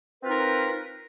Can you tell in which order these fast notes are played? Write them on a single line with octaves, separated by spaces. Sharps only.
B4 C4 F4 D#4 A#4